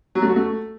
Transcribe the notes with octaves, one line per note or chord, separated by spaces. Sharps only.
F#3
A3
F#4
A3